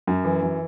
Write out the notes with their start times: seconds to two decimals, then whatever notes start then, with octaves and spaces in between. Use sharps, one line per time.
0.07 F#2
0.25 E3
0.42 F#2